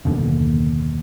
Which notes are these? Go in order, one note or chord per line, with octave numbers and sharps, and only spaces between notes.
F#1 D#2 B2 D3